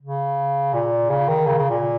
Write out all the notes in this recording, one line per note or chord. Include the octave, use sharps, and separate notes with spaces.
C#3
A#2
C#3
D#3
C#3
C#3
A#2